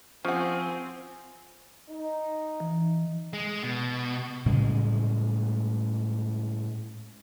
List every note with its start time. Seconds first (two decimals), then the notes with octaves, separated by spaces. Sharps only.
0.25 F3 C4 C#4 G#4 F#5
1.90 D#4
2.60 E3
3.33 G#3
3.63 B2
4.46 A2 C#3 G3 G#3